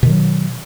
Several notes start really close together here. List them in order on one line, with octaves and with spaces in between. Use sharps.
B2 D#3 F#3